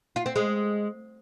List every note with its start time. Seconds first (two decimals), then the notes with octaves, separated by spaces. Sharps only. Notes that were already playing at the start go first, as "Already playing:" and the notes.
0.16 F4
0.26 C4
0.36 G#3